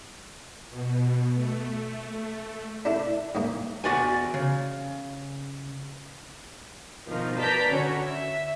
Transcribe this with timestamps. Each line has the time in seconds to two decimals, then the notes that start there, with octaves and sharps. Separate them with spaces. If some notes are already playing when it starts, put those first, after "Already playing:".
0.70 B2
1.35 A3
2.85 D4 E4 A4
3.35 G#2 A#3
3.84 E2 F#4 D5 G#5
4.34 C#3
7.08 B2 D#3 F3 D#4 F4
7.38 B4 D5 A5 A#5 G6 B6
7.70 D3 C#4 F#4 C#5
8.02 E5